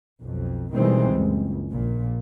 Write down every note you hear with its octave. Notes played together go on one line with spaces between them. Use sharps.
B1 F2
B2 D#3 E3 G3 G#3 C4
F#1 C#2
A#1 A#2